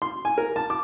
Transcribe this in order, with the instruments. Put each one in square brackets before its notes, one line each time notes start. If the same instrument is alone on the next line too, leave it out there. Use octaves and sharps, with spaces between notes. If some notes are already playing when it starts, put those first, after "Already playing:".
[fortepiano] C6
G#5
A#4
A5
D6